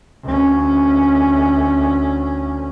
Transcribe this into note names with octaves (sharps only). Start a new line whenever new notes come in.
D2 C#4